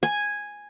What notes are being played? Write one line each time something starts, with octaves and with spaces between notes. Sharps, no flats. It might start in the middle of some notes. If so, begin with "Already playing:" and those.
G#5